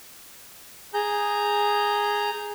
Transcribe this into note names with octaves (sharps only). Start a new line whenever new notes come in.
G#4 A#5 G6